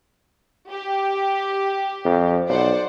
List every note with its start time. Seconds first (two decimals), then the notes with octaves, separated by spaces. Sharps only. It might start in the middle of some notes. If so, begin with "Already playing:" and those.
0.70 G4
2.05 F2
2.49 B1 C5 D5 F#5